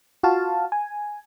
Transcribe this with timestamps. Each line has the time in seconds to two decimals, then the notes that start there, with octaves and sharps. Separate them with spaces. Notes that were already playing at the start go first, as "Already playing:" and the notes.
0.23 F4 F#4 F5 A5
0.72 G#5